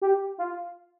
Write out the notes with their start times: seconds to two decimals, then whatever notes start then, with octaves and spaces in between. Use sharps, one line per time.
0.02 G4
0.38 F4